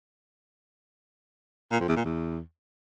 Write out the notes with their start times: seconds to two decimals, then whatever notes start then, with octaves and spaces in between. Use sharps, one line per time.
1.72 A#2
1.80 F2
1.88 E2
1.97 A#2
2.05 E2